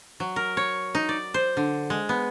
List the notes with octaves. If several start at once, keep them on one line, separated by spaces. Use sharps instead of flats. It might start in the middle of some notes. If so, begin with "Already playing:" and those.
F#3
A#4
C#5
D#4
D5
C5
D3
G#3
B3